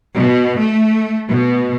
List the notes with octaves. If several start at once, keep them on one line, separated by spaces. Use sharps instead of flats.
B2
A3
B2